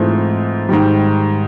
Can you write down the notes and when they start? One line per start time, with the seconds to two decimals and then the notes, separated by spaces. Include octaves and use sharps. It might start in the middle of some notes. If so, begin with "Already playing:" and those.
Already playing: G#2 E3 A3 C4 F4
0.69 G#2 D#3 G3